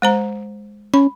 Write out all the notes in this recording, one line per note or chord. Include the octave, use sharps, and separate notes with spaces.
G#3 C5 A#5
C#4 B5